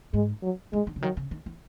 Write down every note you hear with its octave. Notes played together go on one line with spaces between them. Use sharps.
G#2 G#3
F#3
G#2 G#3
D#3
C#3
D#3 F#3
C#3
D#3
E3